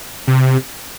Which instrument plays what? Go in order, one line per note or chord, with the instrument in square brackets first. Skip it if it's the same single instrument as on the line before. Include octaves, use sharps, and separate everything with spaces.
[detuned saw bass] C3